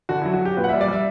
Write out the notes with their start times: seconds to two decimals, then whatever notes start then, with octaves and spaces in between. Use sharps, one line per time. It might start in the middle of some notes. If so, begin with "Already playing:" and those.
0.09 D3 F#4
0.22 E4
0.25 F#3
0.34 F#4
0.41 F#3 G4
0.57 A#2 B4
0.64 F#5
0.69 E5
0.73 G3
0.81 D5
0.88 G3 E5